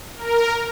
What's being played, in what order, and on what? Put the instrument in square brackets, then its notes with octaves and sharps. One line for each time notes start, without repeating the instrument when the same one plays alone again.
[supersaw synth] A#4